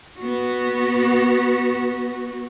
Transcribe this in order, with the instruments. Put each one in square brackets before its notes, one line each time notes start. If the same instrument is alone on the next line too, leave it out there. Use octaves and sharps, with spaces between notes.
[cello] B3 F#4